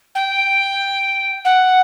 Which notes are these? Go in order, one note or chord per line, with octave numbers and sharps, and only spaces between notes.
G5
F#5